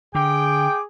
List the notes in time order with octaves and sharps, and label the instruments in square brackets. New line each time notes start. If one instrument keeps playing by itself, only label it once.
[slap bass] D3 [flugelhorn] G#4 [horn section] G5 [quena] D6